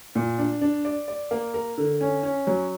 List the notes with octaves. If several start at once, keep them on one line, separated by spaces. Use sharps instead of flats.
A#2
D4
D4
D5
D5
A#3
A#4
D3
C#4
C#4
F#3